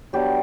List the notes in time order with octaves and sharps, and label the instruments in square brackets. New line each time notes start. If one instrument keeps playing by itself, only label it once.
[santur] F#3 B3 D4 G4